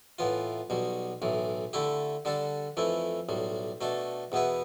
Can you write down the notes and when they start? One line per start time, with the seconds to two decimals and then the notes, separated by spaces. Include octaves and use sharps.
0.19 A2 E3 B3 F4
0.70 B1 B2 G3
1.22 B1 A2 E3
1.73 D3 A3 E4 G4
2.25 D3 G3 D4 A4
2.77 F2 E3 A3 E4
3.29 B1 A2 G3
3.81 B2 A3 D4 A4
4.32 E2 B2 B3 E4 B4